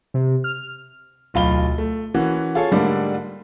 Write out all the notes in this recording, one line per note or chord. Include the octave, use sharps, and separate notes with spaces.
C3
F6
D1 B1 F4 B5 G7
A3
E3 A#3 C#4 F#4
F4 G#4 A4 C#5
G#2 D3 G3 A3 A#3 D4